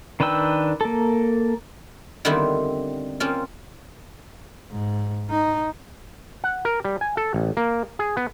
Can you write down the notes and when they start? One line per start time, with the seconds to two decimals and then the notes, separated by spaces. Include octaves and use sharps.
0.20 D#3 D4 B4 G5 E6
0.81 A#3 A4
2.25 D3 D#3 G3 B3 C4 E4
3.20 A#3 C4 C#4 F4
4.71 G#2
5.31 D#4
6.44 F#5
6.65 A#4
6.85 G3
7.01 G#5
7.17 A4
7.34 A1
7.57 A#3
7.99 G#4
8.17 B3